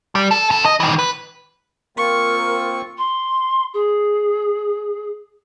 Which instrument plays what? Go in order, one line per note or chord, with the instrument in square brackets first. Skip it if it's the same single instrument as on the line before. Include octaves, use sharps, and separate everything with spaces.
[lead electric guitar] G3
A4
F2 A4
D#5
D#3 E3
B4
[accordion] A#3 C4 F4 [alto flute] A#4 [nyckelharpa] C#6
[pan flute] C6
G#4